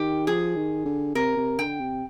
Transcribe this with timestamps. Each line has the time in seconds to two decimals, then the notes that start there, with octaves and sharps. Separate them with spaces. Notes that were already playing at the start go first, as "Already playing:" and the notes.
Already playing: D#3 G4
0.27 F3 G#4
0.57 D#3
0.86 D3
1.15 C3 A#4
1.37 C3
1.59 D3 G5
1.81 C3